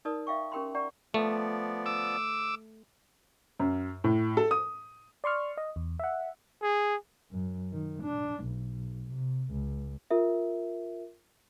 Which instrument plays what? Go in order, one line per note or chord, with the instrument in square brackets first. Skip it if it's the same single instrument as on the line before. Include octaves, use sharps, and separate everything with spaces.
[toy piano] D#4 A#4 B4 D5 A5 D#6
E5 F5 G5 C#6
C#4 G4 A#4 G5 B5 C6
D5 F#5 A#5 C#6
[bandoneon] F3 B3 D5 [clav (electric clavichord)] A3
[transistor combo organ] D6 E6
[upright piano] F#2
A2
A4
D#6
[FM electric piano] D5 C6 C#6 F6
D#5
E2
E5 F#5
[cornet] G#4
[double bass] F#2
D#3
D4
B1
C3
C#2
[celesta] F4 A#4 E5